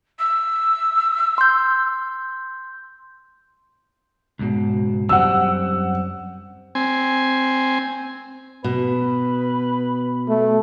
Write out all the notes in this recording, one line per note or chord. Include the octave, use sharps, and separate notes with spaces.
E6
C6 G6
C#2 G#2 B2
F#2 G3 C4 F#5 E6
C4 G#5
B2 B4
A3